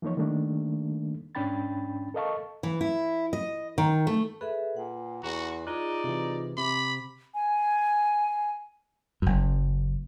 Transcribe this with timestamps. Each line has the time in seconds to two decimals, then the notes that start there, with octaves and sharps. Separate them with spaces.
0.02 E3 F3 A#3 D#4 C#5
0.17 D#3 G3 A3 A#3 D4
1.35 G#2 C#4 D4 G5 B5 A6
2.14 A4 A#4 D#5 F5 A5 C#6
2.63 E3
2.81 E4
3.33 D#5
3.78 D#3
4.07 A3
4.41 G#4 A4 B4 E5
4.77 A#2 F#5
5.23 E2 F#4 A#5
5.67 D#4 F4 G#4 D5 F#6
6.04 C3 E3
6.57 C3 B5 D6
7.34 G#5
9.22 F#1 F#2